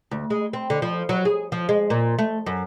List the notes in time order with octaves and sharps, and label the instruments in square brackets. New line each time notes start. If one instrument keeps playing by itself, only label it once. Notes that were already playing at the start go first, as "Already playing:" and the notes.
[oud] D2
G#3
C4
D3
F3
F#3
G#4
F3
G#3
A#2
A3
F#2